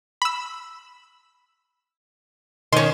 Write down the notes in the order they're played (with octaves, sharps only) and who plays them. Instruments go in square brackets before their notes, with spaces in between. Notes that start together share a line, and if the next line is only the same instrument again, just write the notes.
[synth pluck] B5 E6
[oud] D#3 C#4 [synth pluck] C6